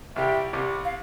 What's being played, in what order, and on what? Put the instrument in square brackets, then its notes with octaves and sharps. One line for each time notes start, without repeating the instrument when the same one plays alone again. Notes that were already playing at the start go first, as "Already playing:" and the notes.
[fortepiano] C2 C3 G3 [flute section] E5 G5
[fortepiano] C2 C3 G3
[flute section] F5